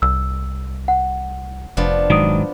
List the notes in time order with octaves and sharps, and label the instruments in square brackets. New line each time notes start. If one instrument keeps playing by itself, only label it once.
[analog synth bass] C2 [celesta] E6
[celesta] F#5
[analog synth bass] F1 [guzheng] F3 B3 D4
[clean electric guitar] G#2 D#3 F#3 [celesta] D#6 D7